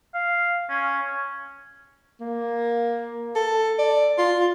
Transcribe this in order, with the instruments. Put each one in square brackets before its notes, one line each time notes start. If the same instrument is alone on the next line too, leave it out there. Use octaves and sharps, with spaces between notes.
[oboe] F5
C#4
[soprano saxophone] A#3
A4
D5
F4